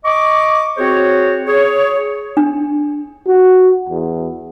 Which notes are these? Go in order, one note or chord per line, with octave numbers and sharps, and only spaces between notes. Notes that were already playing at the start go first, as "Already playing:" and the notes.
D#5 C#6 D6
C4 F#4 G#4 C5 C#5
G#4 C#5
D4
F#4
E2